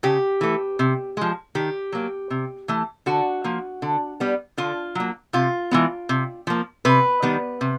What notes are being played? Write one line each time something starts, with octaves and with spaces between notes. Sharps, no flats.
C#3 G4
E3 A3
C3
F3 G#3
D#3 G4
F#3 A#3
C3
E3 A3
D3 F#4
F3 A#3
D3
G3 B3
D3 F4
F#3 A#3
C3 F4
E3 G#3 B3
C3
F3 A#3
C3 B4
D#3 G3 B3
C3